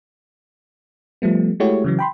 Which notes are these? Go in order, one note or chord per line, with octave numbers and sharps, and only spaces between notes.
F3 G3 A3 B3
G#3 A3 E4 F#4 G4 C#5
C#3 E3 F#3
G5 B5 C6